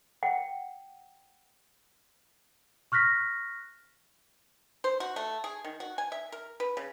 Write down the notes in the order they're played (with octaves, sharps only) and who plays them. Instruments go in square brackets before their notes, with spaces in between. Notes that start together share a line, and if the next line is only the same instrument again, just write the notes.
[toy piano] F#5 G5
[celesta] C#6 F6 F#6 A#6 B6
[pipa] C5
F#4
A3
G#4
D#3
F#4
G#5
E5
A#4
B4
C#3